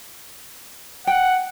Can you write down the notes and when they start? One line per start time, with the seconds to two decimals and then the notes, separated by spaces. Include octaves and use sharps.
1.07 F#5 G5